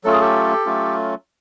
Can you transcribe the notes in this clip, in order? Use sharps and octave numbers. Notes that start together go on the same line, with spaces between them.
F#3 A3 C#4 F4 A4
G#4
G4 A4
F#3 A3 C#4 F4